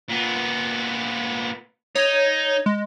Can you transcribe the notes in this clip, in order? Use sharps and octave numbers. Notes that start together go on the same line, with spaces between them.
A#2 B3
D#4 C#5
G#3